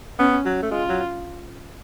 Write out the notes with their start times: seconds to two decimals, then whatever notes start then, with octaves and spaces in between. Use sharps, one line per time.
0.19 B3 C#4
0.46 F#3
0.62 A3
0.71 G#3 F4
0.89 F#3